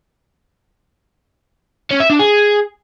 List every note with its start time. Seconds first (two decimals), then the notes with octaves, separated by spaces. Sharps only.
1.91 C#4
2.00 E5
2.10 D4
2.19 G#4